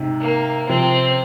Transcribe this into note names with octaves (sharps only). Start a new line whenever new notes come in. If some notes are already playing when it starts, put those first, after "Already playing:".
Already playing: G#2 C3
A#3
C3 F3 C4